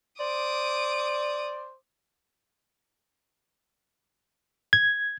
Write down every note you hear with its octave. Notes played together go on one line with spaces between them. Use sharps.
C5 D5 D6 D#6
G#6